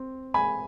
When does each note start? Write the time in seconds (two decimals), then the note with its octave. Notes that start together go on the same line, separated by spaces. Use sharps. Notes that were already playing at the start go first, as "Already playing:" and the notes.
Already playing: C4
0.34 G#5 B5